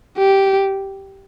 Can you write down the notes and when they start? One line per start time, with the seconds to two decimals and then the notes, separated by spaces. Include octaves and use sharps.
0.18 G4